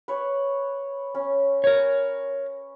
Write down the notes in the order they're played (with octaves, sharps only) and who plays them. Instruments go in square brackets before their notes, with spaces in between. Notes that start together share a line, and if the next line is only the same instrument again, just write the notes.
[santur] B4 C#5
C#4
[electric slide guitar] A#4 C#5